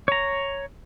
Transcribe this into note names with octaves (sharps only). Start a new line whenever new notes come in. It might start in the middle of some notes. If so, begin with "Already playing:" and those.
C#5 A#5